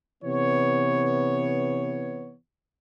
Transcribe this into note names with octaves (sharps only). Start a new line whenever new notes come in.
C3 E3 B3 C#5